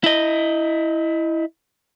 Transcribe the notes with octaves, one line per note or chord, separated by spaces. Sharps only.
E4 D#5